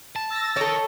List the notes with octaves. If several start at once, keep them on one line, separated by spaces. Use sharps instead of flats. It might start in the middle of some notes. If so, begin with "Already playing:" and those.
A5
E6 A6 A#6
A4 A#4 C#5 D#5